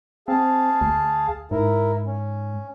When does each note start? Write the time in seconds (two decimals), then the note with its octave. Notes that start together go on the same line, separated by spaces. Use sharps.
0.28 C4 G#4 F5 A5
0.81 D2
1.51 G#2 E4 A#4
2.07 C#4